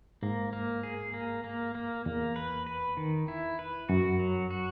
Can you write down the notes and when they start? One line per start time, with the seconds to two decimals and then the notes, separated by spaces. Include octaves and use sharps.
0.22 G#2 A#3
0.53 A#3
0.83 G#4
1.14 A#3
1.44 A#3
1.75 A#3
2.05 E2 A#3
2.36 B4
2.66 B4
2.97 D#3
3.28 E4
3.59 B4
3.89 F#2 F#4
4.19 F#3
4.51 F#4